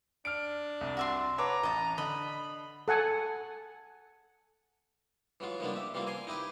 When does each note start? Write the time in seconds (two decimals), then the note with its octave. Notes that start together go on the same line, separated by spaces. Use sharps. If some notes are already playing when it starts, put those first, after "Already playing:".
0.25 D4 F6 D7
0.81 C2
0.97 F#4 E5 C6
1.38 B4 C#5 A5 A#5 D6
1.63 A1 D#5 A5
1.98 D3 D#5 B5
2.88 A4 F#5 G#5 A5
5.40 E3 F#3 G#3 F4
5.60 D#3 F3 G3 A#3 B3 D4
5.73 G4 E5
5.94 E3 G3 A#3 C4 F4
6.07 A#4 G#5 C6
6.27 D#4 E4 G4 B4 D#5